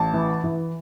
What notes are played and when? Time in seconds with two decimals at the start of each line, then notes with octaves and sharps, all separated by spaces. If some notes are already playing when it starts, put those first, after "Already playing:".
Already playing: A1 A5
0.14 E3
0.44 E3